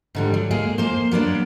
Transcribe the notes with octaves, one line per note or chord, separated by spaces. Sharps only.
G#2 D3 G3
F#3
G#3 A#3 G#4
A#3 C5
F#3 A#3 B3 D4